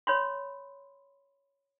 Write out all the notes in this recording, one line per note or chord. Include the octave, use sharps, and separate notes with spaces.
C#5 B5 C6